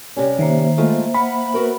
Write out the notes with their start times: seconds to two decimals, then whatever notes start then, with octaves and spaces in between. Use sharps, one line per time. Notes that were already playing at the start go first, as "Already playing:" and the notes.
0.17 C3 G3 C#4
0.39 D#3 A#3 C5 E5
0.77 G#3 A3 F4
1.14 F5 F#5 B5
1.54 B3 F#4 A#4